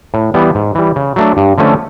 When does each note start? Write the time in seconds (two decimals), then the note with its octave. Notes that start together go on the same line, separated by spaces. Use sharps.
0.14 A2
0.34 E3 G3 B3
0.55 G#2
0.75 E3 G3
0.96 C#3
1.16 F#3 A3 D4
1.37 G2
1.58 D3 F3 A3 C#4